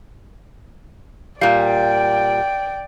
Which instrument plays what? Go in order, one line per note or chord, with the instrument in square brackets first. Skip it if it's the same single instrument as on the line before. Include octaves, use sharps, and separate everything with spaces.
[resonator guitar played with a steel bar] A#2 G3 [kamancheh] D5 G5 [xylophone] F5